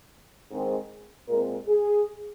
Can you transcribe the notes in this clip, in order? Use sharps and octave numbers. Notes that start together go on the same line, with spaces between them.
G#2 D#3 G#3 C4
A#2 G#3 C4 A#4
G#4